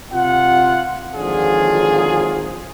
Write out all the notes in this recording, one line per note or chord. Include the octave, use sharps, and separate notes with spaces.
C3 F4 F#5
G#1 D3 F3 F#3 F4 G#4